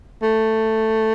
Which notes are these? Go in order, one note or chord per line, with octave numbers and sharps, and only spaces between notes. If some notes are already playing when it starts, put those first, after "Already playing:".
A3